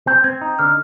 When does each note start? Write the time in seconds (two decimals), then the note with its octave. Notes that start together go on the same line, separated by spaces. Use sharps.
0.07 C4 G6
0.24 C4 G#6
0.41 D#4
0.59 D3 F6